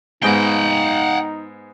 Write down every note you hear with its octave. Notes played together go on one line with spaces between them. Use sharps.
G#2 G#3 B3 D#4 F#5 G5